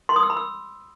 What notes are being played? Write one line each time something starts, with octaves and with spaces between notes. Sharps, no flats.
C6
D#6
E6
B5
E6